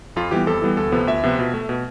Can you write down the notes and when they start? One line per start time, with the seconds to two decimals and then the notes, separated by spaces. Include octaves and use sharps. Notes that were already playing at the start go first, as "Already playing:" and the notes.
0.16 F2 F4
0.31 E3 G3 B3 G4
0.47 F2 A4
0.62 E3 G3 B3
0.77 D2 A4
0.92 C3 F3 B3
1.07 D2 E5
1.23 C3 F3 B3
1.39 B2
1.54 A3
1.69 B2